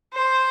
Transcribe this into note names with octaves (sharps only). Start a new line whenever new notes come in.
C5